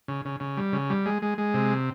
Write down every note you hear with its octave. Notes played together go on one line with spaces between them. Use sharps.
C#3
C#3
C#3
G3
C#3
G3
G#3
G#3
G#3
C3